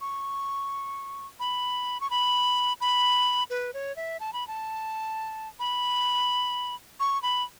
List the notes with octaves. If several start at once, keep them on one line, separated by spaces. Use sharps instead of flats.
C#6
B5
C#6
B5
B5
B4
C#5
E5
A5
B5
A5
B5
C#6
B5